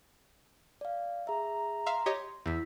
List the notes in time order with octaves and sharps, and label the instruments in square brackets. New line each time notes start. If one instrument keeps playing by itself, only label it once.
[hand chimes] D5 F5
[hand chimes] G#4 E5 [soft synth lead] A#5
[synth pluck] E5 F5 [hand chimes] C6
[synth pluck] G4 C#5 D#5
[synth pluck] E2 [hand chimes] E4 B6 [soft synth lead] E6